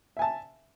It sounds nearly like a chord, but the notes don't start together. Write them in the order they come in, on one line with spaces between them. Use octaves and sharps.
E5 G#5 A5